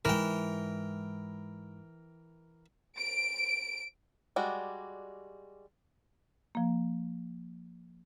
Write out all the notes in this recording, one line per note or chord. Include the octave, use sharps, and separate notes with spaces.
G#2 E3 G#3 A#4 G5
D7
G3 G#3 F#4 D5
F3 A#3